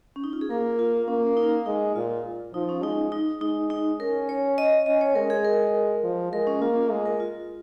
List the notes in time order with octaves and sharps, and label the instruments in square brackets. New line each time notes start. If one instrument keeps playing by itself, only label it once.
[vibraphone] C#4
D#4
F4
G#4
[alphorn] A#3 [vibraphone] A#4
[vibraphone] F4
[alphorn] A#3 [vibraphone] C#4
[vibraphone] D#4
[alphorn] G#3 [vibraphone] D#4
[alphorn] A#2 [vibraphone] F4
[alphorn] F3 [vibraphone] D#4
[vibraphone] C#4
[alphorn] G#3 [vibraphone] D#4
[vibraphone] D#4
[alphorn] G#3 [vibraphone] D#4
[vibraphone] D#4
[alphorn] C#4 [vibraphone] A#4
[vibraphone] C#5
D#5
[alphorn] C#4 [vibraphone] D#5
[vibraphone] C#5
[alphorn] G#3 [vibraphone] A#4
[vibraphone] G#4
A#4
[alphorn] F3
[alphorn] G#3 [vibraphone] A#4
[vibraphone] C#4
[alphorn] A#3 [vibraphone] F4
[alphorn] G#3
[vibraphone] A#4
F4